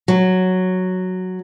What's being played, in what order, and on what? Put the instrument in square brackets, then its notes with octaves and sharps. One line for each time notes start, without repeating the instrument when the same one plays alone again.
[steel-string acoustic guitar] F#3